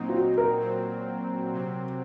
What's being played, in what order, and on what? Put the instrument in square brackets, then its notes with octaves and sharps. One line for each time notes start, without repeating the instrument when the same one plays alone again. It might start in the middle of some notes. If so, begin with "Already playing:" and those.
Already playing: [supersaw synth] A#2 F#3 C4 D#4
[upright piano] F4
F#4
A#4
[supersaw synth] A#2 F#3 C4
C3 F#3 C4